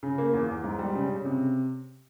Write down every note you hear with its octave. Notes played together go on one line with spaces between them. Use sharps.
C#3
A#3
E2
E2
G#2
G3
C#3
C#3
C3